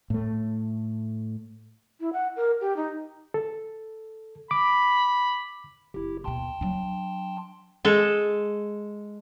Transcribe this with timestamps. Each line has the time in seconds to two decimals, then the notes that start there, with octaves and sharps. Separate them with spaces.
0.10 A2 A3
2.00 E4
2.13 F#5
2.36 A#4
2.61 G4
2.76 D#4
3.34 A4
4.51 B5 D6
5.94 F#1 E4 G4
6.24 D#2 B2 G5 A5 C6
6.61 F#3 D4
7.85 G#3 A4